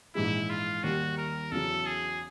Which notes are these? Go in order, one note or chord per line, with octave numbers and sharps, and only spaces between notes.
A#1 G#2 E3 G#3 E4
F4
D#2 D#3 G3 F#4
A#4
E2 C#3 F#3 A4
G#4